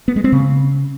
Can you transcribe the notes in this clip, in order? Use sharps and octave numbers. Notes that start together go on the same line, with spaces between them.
B3
G#3
C4
C#3